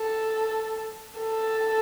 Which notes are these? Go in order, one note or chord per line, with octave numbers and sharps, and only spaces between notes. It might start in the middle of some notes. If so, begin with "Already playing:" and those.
Already playing: A4
A4